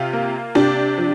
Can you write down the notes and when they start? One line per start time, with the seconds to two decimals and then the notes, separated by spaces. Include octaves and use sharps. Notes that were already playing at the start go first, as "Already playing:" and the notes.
Already playing: C3 F4
0.13 A#3
0.55 C3 D4 G4
0.98 F3